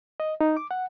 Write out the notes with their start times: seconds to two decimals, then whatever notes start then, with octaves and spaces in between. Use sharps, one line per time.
0.20 D#5
0.41 D#4
0.57 D6
0.71 F#5